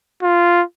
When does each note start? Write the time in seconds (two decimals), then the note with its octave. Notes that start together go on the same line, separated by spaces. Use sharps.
0.23 F4